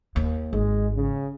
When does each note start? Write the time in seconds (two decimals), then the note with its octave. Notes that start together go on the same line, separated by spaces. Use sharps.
0.16 D#2
0.53 G#1 G#3
0.94 C#3